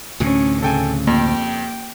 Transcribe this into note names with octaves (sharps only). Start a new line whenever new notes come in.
D2 A2 C3 C#4
C#3 A4 G5 G#5
F2 A#3 G4 G5